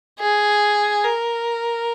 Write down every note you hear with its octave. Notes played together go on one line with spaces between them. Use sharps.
G#4
A#4